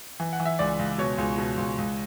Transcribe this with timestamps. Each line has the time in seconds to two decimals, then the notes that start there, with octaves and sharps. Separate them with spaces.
0.20 E3
0.33 F#5
0.40 E3
0.45 E5
0.59 C#2 D5
0.79 C#2
0.98 B2 C#5
1.18 C#2
1.38 B2
1.58 C#2
1.78 C#2